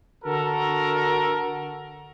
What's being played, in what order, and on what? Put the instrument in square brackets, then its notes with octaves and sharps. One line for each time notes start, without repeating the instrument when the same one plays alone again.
[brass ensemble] D3 F#4 A4 A#4